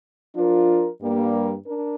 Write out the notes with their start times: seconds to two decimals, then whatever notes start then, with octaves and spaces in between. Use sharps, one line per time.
0.34 F3 D4 F4 A#4
1.00 G2 G3 A#3
1.66 D4 A#4